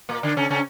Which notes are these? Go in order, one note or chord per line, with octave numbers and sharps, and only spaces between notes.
A#2 A#3
D3 D4
C#3 C#4
C#3 C#4